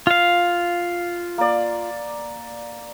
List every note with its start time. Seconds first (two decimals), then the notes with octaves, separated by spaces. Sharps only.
0.07 F4 F5
1.38 A#3 D5